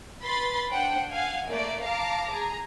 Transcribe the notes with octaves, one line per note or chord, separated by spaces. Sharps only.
B4 B5 C6 A6
D4 C5 F#5 G5
F5 F#5 G#5
A3 A#3 D5
F5 A5 A#5 D6
G#4 A#5